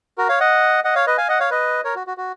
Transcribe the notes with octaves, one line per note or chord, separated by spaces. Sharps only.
F#4 A#4
C#5 F5
D#5 F#5
D#5 F#5
C#5 F5
B4 D#5
F5 G#5
D#5 F#5
C#5 F5
B4 D#5
A#4 C#5
F#4
F#4
F#4